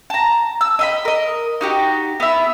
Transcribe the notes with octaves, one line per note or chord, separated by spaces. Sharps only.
A5 A#5
E6
D#5 E5 B5
A#4 D#5
D#4 F#4 G4
B3 E5